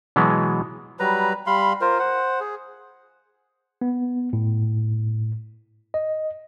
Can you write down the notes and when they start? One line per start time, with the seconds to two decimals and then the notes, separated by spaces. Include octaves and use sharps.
0.16 B2 E3 F#3 G#3 B3
1.00 F#3 G3 B4 A#5
1.47 G3 F5 B5 C6
1.81 F4 A#4 C5
1.99 C5 F#5
2.40 G#4
3.81 B3
4.33 A2
5.94 D#5